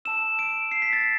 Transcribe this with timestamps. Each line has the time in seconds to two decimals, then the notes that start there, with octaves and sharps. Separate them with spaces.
0.05 A5 E6 E7
0.39 D7
0.71 C7
0.82 B6
0.93 A6